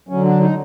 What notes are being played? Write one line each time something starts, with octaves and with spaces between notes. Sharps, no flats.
D3 F#3 C#4
D4
D#4